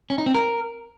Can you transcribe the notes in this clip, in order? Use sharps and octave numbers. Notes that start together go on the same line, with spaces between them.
C#4
D#4
C4
A#4